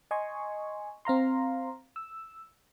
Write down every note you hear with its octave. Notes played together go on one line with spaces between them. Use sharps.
D#5 G#5 C6 C#6
C4 F5 A#5 C6
E6